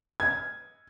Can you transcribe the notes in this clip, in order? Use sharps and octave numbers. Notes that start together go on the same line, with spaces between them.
G#6